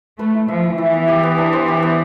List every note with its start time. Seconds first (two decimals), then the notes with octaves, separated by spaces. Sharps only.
0.19 A3 B4
0.35 E4
0.48 F3 E5
0.63 E4
0.78 E3 E4
0.94 B3
1.08 G4
1.23 B3
1.38 D4
1.53 C5
1.68 G4
1.82 B3